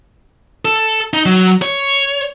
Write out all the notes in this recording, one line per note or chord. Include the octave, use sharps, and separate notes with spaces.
A4
D#4
F#3
C#5